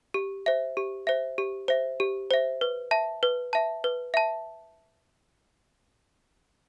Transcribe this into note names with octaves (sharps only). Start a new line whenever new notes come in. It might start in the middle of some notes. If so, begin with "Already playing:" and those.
G4
C5 E5
G4
C5 E5
G4
C5 E5
G4
C5 E5
B4
E5 A5
B4
E5 A5
B4
E5 A5